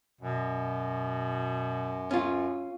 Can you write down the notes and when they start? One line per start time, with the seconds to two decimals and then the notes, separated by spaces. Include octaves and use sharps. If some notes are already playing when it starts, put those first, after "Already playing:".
0.21 F#2 B2
2.11 C#4 F4